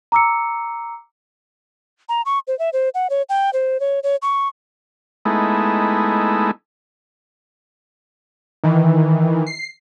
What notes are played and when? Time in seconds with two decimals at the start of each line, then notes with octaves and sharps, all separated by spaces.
0.12 A#5 D6 E6 C#7
2.09 A#5
2.26 C#6
2.48 C5
2.59 E5
2.73 C5
2.94 F#5
3.10 C#5
3.29 G5
3.53 C5
3.80 C#5
4.03 C#5
4.22 C#6
5.25 G#3 A3 B3 D#4 E4
8.64 D#3 E3
9.47 C7